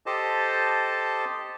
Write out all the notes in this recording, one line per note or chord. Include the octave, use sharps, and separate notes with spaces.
G4 A4 C5 D#5 A5